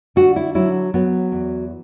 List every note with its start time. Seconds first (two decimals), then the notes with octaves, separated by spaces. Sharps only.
0.16 D3 F#4
0.36 E4
0.55 F#3 E4
0.94 F#3 B3
1.32 E2